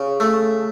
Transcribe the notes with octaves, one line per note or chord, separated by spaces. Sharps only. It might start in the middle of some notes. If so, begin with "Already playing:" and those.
Already playing: C#3
A3